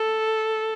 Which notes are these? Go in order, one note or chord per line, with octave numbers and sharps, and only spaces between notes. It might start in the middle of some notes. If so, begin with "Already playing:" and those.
Already playing: A4